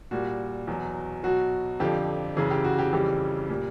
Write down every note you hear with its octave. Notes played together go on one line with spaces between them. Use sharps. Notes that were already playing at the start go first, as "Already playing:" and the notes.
A#2 G3 F#4
E2 B2 F#3
B2 F#3 F#4
F2 D3 F3 G4
F#2 C#3 E3 G#4
G4
F#4
G4
F2 C#3 E3 G3 G4
A#2 G3